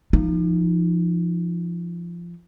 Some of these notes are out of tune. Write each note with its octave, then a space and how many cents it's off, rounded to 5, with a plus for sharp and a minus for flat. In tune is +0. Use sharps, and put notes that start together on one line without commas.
F3 -20 D#4 +0